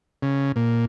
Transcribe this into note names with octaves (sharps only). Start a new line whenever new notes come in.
C#3
A#2